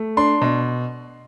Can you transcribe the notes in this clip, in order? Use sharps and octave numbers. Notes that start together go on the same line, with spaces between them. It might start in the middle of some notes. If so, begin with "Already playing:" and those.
Already playing: A3
D4 C6
B2